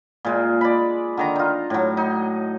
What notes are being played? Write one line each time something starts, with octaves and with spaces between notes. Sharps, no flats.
A#2 G#3
D5 B5
D3 D#3 A#5
D#4 F4
A2 F#3
D#4